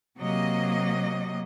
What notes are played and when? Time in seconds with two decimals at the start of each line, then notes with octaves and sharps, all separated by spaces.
0.17 C3 F#3 A#3 D#5